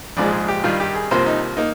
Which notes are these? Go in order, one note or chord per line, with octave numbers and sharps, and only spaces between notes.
A#1 G#2 F3 G#3 D5
G#4
G4
G2 D#3 G3 F4
G4
G#4
C2 C3 F3 A#3 C5
D#4
A#3 D#4